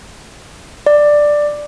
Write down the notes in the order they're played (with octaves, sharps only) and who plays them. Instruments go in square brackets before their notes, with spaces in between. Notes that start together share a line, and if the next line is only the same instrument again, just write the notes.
[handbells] D5